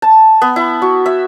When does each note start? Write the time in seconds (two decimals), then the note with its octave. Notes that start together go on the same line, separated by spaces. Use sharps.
0.02 A5
0.42 B3
0.56 E4
0.82 F#4
1.06 E5